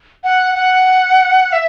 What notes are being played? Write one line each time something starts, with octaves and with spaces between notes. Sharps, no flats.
F#5
F#5
E5